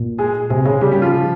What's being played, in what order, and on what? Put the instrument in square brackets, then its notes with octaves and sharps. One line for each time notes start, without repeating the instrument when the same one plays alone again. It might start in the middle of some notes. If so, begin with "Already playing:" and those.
Already playing: [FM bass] A#2
[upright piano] G#3 G#4
[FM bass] C3 [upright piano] G#3 G#4
[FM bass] C#3 [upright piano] G#3 G#4
[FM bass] C#3 [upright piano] G3 G4
[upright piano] G3 G4
F3 F4